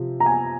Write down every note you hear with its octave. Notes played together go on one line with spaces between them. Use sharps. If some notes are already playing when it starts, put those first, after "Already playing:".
Already playing: C3 F3
A#5
G#5